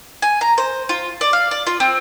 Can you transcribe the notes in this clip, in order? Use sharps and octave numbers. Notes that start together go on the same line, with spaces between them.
G#5
A#5
C5
F4
D5
F5
D5
F4
C4